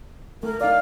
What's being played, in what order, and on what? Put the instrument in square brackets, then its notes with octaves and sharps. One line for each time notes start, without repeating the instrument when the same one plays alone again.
[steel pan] A3 [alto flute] A#4
[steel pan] D#4 D5 [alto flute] F5